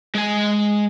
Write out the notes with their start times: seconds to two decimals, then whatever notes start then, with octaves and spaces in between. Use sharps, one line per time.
0.15 G#3 G#5